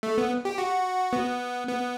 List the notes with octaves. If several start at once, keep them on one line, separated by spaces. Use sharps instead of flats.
A3
B3
G4
F#4
B3
B3